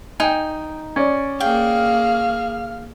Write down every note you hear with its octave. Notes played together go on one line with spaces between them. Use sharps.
D#4 G5 G#5
C#4 D5
A#3 G#4 F5 G5 F6